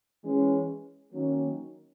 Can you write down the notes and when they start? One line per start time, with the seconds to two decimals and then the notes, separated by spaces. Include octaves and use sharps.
0.22 E3 G#3 C#4
1.13 D#3 F#3 A#3 C#4